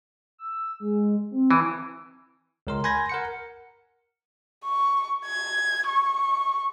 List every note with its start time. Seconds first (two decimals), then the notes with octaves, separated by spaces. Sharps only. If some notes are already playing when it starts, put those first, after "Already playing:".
0.38 E6
0.80 G#3
1.31 C4
1.51 E3
2.67 C#2 A#4 C6
2.84 G#5 B5 C6 G6 G#6 A#6
3.09 A#4 F#5 C#7
4.65 C#6
5.26 G#6
5.87 C#6